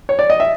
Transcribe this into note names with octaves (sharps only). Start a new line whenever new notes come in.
C#5
D5
D#5
E5